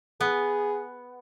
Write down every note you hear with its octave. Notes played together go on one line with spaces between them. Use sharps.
B3 G#4